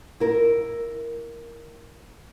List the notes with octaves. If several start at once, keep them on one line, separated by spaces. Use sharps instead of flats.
E4 A#4